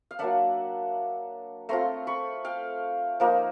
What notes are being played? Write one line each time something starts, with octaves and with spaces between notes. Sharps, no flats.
F5
F#3 A#3 D4 E5 F#5
A3 C4 F4 A#5 C6
B5 C#6
F5 G5
F3 A#3 D#4